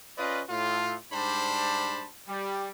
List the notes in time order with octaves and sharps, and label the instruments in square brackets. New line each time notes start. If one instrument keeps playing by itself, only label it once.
[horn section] C#4 F4 B4 D5 D#5
A2 F4 A4
G#2 G3 D4 C5 A5 B5
G3